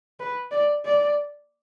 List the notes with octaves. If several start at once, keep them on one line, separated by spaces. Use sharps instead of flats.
B4
D5
D5